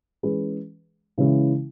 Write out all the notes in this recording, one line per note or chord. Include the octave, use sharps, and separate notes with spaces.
E3 G#3 C#4 G#4 B4
C#3 E3 G#3 C#4 E4